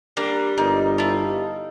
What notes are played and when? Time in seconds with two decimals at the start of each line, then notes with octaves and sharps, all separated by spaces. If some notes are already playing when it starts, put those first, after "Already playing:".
0.17 G3 A#3 D4
0.58 G1 A#3 D#4 D#5
0.98 E4 F4 A4